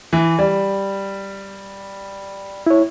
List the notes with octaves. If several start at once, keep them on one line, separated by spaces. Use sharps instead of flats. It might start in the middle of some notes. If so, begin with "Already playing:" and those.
E3
G3
E4 C#5